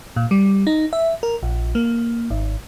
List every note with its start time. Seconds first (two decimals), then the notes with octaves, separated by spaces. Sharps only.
0.16 A#2
0.31 G3
0.67 D#4
0.93 E5
1.23 A#4
1.43 A#1
1.75 A#3
2.30 G#1